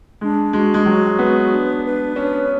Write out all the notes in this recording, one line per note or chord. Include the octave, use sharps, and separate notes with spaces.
G#3 D4
G#3 F#4
G#3
F#3 F#4
B3 B4
D4
B4
C#4 D4